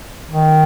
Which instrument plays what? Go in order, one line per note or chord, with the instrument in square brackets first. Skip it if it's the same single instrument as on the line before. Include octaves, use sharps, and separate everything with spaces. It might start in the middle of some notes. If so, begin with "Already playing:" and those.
[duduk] D#3